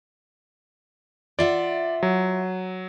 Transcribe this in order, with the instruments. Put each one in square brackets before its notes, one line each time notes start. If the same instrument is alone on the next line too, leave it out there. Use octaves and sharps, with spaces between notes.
[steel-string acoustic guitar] F4 E5 F#5 [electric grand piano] D5
[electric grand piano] F#3